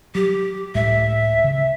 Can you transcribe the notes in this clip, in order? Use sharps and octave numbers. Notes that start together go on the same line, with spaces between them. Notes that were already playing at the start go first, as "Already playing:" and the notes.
F#3 G4
C#2 A2 G#3 E5
C#3